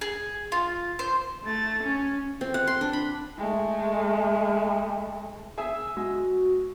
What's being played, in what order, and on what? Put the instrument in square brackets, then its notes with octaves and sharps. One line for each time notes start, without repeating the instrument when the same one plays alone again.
[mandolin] G#4
F4
C5
[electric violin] A3 A6
C#4
[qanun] C4
F#5
C6
D4
B5
[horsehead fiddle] G#3 A3
[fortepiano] G#4 E5 G#5 [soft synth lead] E6
[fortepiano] G#3 [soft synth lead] F#4